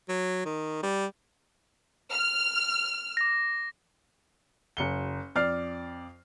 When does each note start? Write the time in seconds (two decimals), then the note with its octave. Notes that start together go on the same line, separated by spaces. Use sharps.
0.09 F#3
0.45 D#3
0.83 G3
2.12 F6
3.17 D6 A#6
4.77 F#1 C#7 G7
5.35 F2 D5 F6 C7